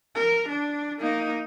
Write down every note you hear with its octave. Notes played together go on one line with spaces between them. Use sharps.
A#4
D4
A#3 D#4